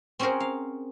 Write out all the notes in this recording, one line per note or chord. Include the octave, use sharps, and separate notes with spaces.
C4 C#4 F#4 G#4 A#4 C5
F5